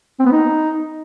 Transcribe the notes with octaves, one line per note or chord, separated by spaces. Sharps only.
C4
B3
D#4